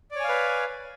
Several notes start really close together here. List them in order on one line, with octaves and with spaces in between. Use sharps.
D5 C#5 G#5 F5 B4